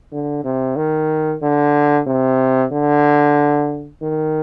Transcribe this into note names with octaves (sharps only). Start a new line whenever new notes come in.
D3
C3
D#3
D3
C3
D3
D#3